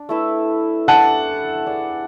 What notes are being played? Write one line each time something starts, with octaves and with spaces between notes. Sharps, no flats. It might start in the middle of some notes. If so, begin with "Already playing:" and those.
Already playing: D4
A3 E4 B4 E5
D4 A4 E5 F#5 A5
D4 G#4 B4